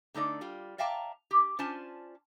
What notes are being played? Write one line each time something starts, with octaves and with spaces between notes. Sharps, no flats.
D3 A3 D#4 D5
G3 F4
D5 E5 F5 G5 A5 A#5
G4
C#4 F4 C5 D5 G#5 A5